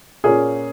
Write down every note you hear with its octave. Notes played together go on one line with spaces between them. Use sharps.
A#2 A#3 C#4 G#4